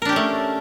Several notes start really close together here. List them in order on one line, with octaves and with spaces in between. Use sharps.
A#4 D4 G4 C#4 A3